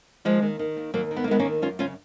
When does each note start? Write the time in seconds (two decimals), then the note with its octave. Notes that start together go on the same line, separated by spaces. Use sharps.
0.25 D#2 F3 G#3
0.42 D#3
0.59 D#3
0.76 D#2
0.94 D#2 F#3 A#3
1.11 D#3
1.17 B3
1.24 A#3
1.28 D#3 G#3 B3
1.39 A#3 C#4
1.45 D#2
1.62 F#2 C#4 F4
1.79 C#3 C#4 F4